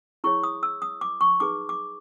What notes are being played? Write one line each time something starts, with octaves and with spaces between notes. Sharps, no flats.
E4 G#4 C#5 C#6
D#6
E6
D#6
D6
C#6
D#4 G#4 B4 D6
D6